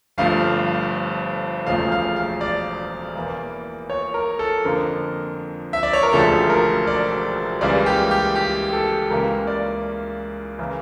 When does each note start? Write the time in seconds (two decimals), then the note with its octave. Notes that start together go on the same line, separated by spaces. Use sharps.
0.18 G1 G2 F3 A3 F5
1.66 E1 E2 C#3 F3 A3 F5
1.92 F5
2.16 F5
2.41 D5
3.16 E2 E3 A#3
3.90 C#5
4.14 A#4
4.39 A4
4.64 F2 D3 F3 A#3 A#4
5.73 E5
5.83 D5
5.93 C#5
6.03 A#4
6.13 E1 D2 C#3 F3 A3 A4
6.50 A#4
6.87 D5
7.61 C#2 C#3 E3 G3 A#3 D5
7.86 G4
8.11 G4
8.36 G4
8.73 A4
9.10 C#2 C#3 E3 A#3 A#4
9.47 D5
10.59 C#3 E3 A#3